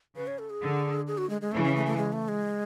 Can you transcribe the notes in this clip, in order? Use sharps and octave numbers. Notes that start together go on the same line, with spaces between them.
C#3 B4
C#5
A4
G#4
D3
G#4
F#4
G#3
G#3
C#3 E3 A3
C#4
A3
A3
G#3
A3
G#3